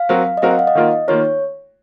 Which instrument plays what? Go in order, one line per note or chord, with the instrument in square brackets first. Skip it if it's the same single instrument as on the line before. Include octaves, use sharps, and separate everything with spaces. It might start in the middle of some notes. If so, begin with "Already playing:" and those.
Already playing: [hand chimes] F5
[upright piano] F#3 C4 F#4 A#4
[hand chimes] D#5
[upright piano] F#3 C4 F#4 A#4 [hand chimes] F5
[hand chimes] F#5
F5
D#5
[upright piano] D#3 A#3 F4 A#4
[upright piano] D#3 A#3 F4 A#4 [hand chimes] C#5